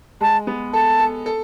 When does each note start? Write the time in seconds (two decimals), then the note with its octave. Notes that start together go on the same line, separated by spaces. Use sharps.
0.21 G#3 A5
0.47 B3
0.73 A4 A5
0.99 A4
1.26 A4